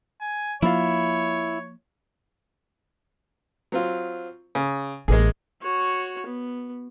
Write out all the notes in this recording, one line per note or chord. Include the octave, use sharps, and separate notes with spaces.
G#5
F3 A#3 E4 F4 C#5
F#3 C4 F4
C#3
A1 G#3 A#3 G#4
F#4 C#5
B3